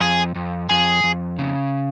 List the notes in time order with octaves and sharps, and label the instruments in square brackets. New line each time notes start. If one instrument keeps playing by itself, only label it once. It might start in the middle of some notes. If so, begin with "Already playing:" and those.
[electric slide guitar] F2 [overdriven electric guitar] G#4
[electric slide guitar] F2
[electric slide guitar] F2 [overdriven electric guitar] G#4
[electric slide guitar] F2
C#3